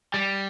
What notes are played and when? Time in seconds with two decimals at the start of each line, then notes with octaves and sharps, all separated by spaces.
0.14 G3